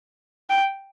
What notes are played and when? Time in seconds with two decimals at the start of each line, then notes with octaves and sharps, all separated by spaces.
0.50 G5